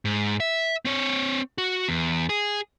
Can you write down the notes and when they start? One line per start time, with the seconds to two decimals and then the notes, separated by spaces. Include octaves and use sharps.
0.05 G#2
0.40 E5
0.85 C4 C#5
1.58 F#4
1.89 E2
2.29 G#4